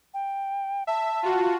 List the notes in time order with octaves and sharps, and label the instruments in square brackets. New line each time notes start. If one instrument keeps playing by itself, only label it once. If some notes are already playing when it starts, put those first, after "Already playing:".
[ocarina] G5
[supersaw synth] E5 [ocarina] A5
[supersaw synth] F4 F#4